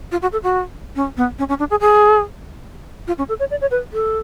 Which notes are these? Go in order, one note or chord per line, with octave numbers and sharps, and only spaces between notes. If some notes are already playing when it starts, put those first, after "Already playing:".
F4
F#4
A4
F#4
C#4
B3
C#4
C#4
D4
G#4
G#4
F4
C#4
A4
C#5
D5
C#5
B4
A4